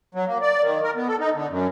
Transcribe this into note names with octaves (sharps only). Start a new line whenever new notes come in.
F#3
A#3
D5
D#3
A#4
B3
A4
D#4
D3
F#2